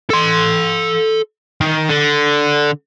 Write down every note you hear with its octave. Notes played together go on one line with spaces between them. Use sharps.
A4 C6
D#3
D3